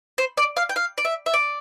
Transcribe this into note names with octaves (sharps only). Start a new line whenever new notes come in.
C5
D5
F5
G5
F5
D5
E5
E5
D5